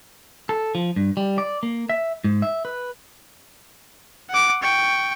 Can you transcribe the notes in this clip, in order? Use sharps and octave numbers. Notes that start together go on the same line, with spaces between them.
A4
F3
G2
G3
D5
A#3
E5
G#2
E5
B4
F#5 D6
G5 C#6